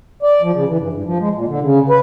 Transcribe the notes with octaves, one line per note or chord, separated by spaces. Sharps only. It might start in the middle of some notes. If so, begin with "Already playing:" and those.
D5
F3
C#3
E3
G2
G2
F3
G#3
A#2
D3
C#3
B4